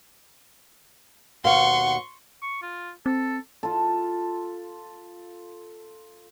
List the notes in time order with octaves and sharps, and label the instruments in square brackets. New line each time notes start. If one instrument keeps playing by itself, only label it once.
[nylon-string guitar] D#2 B2 F5 [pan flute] F#5 [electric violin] C6 C#6
[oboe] C#6
F4
[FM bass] C4 [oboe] A4
[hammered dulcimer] F4 A4